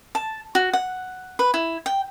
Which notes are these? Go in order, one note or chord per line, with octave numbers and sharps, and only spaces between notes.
A5
F#4
F#5
B4
E4
G5